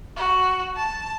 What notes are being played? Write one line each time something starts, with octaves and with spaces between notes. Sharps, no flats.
F#4
A5